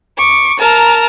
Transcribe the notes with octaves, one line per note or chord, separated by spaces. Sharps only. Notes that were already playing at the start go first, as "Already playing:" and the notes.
C#6 D6
A#4 A5 A#5